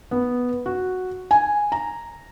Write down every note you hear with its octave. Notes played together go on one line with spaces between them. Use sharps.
B3
F#4
G#5
A#5